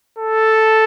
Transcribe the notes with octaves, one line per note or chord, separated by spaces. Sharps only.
A4